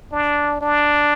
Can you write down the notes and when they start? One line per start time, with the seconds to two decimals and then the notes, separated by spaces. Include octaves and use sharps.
0.12 D4
0.61 D4